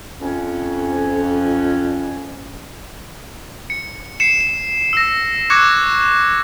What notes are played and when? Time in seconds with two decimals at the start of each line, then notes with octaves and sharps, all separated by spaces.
0.21 F2 C#4
3.70 C#7
4.20 C7 C#7 E7
4.41 E7
4.93 E6 A#6
5.50 C#6 D6 F#6 G#6 A#6 C#7